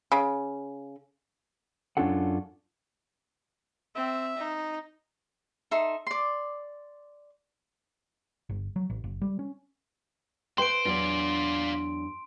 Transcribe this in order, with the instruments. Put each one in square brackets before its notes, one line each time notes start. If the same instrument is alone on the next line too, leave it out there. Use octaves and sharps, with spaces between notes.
[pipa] C#3
[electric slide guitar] F#2 C#4 D4 F4 A4 F#5
[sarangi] C4 [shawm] E5
[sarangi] D#4
[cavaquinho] D#4 A4 E5 C6
D5 C6
[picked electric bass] G1
F#3
A1
F#1
G3
C#4
[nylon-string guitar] B4 E5 G5 [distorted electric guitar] C5 [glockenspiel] C6 D7
[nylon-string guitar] E2 F#3 D4 [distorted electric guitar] F4 D5